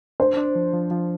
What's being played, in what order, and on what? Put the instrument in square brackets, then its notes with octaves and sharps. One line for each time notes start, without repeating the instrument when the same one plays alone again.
[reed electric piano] D4 [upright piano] C5
[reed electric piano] D4
F3
F3
F3